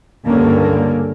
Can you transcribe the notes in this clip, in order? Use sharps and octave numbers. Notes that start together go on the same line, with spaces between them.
C#2 G2 D3 A#3 C#4